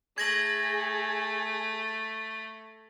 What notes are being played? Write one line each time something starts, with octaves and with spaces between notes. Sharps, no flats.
A3 G#4 G#6 A#6 F#7